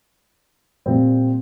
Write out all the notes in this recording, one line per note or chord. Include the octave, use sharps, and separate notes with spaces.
A#2 G3 C4